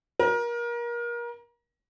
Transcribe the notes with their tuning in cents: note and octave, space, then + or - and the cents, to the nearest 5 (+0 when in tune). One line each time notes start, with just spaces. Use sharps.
A#4 +30